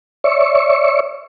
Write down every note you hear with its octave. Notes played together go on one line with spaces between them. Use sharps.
C#5 D5 E5 C#6